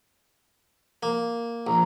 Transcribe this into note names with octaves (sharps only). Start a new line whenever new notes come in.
A#3
A#1 A#5